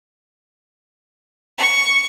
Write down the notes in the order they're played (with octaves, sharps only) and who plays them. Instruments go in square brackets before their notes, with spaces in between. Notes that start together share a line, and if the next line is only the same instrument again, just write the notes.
[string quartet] C#6